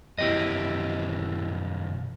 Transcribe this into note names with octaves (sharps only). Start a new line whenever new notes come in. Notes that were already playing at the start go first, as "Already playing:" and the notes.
F#2 B2 E3 E4 G4 D#5